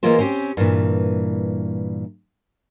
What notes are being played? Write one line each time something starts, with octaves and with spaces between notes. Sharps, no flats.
E3 G#3 A#3 F4 C5
C4 C#4 G4
G2 A#2 E3